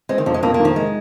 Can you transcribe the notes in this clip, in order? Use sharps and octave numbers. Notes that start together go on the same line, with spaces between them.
G#3 C4
D#3
F2 F3
G#3
F2 A#3
A#3
D#3 F3
G#3